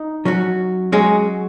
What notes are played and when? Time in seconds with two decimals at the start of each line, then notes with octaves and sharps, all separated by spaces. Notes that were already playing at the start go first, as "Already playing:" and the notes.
Already playing: D#4
0.25 F#3 C#4 F#4
0.92 F#3 G#3 C#4 F#4